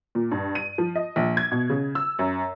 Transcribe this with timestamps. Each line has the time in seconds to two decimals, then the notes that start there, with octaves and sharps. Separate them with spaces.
0.15 A#2
0.31 G2
0.55 D#7
0.78 F3
0.96 D#5
1.16 A#1
1.37 G#6
1.52 B2
1.70 C#3
1.95 E6
2.19 F#2